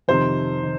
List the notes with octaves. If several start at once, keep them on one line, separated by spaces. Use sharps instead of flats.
F2 C3 D#3 C5
D#3